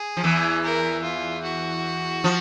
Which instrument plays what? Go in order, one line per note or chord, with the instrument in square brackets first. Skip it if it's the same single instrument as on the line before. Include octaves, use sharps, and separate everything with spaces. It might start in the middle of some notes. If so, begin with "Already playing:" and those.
Already playing: [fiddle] G#4
[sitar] F3
E2 E3
[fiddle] A#4
F4
F#4
[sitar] F3